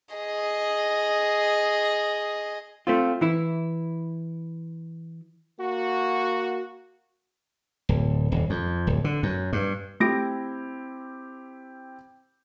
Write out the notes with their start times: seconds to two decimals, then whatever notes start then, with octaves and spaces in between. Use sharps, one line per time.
0.15 G#4 D#5
2.87 A3 C4 F4
3.21 E3 E4
5.60 A#3 F#4
7.89 D1
8.32 D#1
8.50 F2
8.87 D1
9.04 D3
9.23 F#2
9.53 G2
10.00 A3 C4 E4 G4 A#6 D7